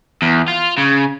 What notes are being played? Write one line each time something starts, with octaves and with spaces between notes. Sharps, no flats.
E2
F4
C#3